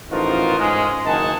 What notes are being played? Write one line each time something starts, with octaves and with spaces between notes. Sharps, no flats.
A1 F3 D#4 F4 F#4 A#4
G#2 G#3 C#4
F#1 D#3 D#5 F#5 G#5 A5